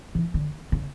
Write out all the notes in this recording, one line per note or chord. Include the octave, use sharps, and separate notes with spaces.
E3
D3
C#3